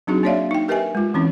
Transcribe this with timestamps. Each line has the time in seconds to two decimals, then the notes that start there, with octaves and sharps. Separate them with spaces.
0.07 F#3 C4 D4 D#4 F#4 G#4
0.23 A#3 D4 C#5 D5 E5 F5
0.51 D#4 G5
0.68 G4 A#4 B4 D#5 E5 G#5
0.95 G#3 F4
1.14 E3 C4 C#4 E4